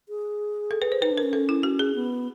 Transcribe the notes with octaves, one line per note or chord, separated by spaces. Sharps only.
G#4
A4
B4
C5
D#4 B4
D4
A#4
C#4
A4
E4
F#4
G#4
B3